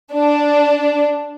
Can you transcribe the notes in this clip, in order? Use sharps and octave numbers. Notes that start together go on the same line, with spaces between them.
D4